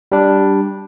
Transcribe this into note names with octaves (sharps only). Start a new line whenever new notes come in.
G3 D4